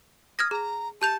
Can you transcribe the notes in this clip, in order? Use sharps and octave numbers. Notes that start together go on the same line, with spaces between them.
D#6 F6 G#6 A#6
G#4 A#5
G4 A5 G6 F7